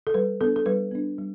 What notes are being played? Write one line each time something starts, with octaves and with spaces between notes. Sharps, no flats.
A4
G3 B4
B3 D4 A4
A4
G3 B4
B3 D4
G3